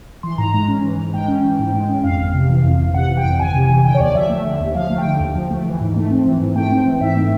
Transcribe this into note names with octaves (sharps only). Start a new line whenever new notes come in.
E3 C6
G#2 A#5
G#3 A#5
C#4
E3
G#2
G#3 G5
C#4
E3
G#2
G#3
C#4
F2 F5
G1
C3
E3
F2
G1
C3 F#5
E3
G5
F2
G1 G#5
C3
E3
D3 G5
C#5
D#2 D5
F3 E5
A3
D3
D#2
F3 F5
A3
G5
D3
D#2
F3
A3
E3
G#2
A3
C4
E3
G#2
A3 G5
C4
E3
G#2 E5
A3